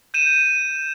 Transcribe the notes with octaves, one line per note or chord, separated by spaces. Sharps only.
G6 D#7 E7